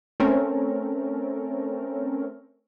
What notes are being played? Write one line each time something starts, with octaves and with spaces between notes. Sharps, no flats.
A3 C4 C#4 A4 A#4